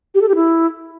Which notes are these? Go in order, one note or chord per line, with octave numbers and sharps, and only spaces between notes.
G4
A4
G4
E4